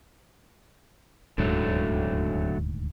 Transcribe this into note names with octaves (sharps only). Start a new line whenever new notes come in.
D#1 D2 G#2 D3 F#3 A3